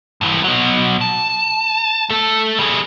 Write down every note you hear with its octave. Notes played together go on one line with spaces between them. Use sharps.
G2 E3
B2 F#3
A5
A3 A4
G3 G#4